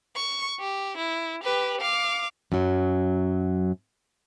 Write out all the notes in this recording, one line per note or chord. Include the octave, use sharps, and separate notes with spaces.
C#6
G4
E4
G4 B4
F5 D6
F#2 F#3